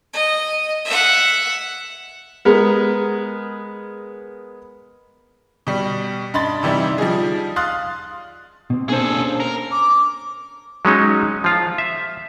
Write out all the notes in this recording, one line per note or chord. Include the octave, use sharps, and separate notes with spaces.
D#5
E5 F#5
G#3 B3 A#4
B2 G3
G2 D#5 B5 C6 A6
C3 E3 G3 D#4 E4
F3 G3 D#4 G#4
F5 C6 D#6 F6 F#6 A6
B2 C4
A#3 D4 G#4 A4 C5
C#4
A#4
D6
F#3 G#3 C#4 D#4
F3 F4
E5